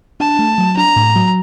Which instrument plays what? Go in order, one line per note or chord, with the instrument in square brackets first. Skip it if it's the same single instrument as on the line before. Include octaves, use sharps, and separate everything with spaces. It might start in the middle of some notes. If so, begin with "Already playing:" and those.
[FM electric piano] D4 [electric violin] A5
[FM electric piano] A3
F#3
[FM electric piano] D4 [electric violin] A#5
[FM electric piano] A2
F#3